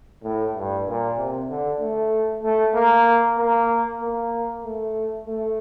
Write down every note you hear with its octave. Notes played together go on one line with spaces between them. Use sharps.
A2
G2
A#2
C3
D3
A3
A3
A#3
A#3
A#3
A3
A3